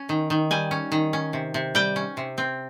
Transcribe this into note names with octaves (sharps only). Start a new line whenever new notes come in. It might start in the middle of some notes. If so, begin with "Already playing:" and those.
Already playing: C#4
D#3
D#3
G3 G#5
C#4
D#3
C#4
C3
C3
G3 G5
C#4
C3
C4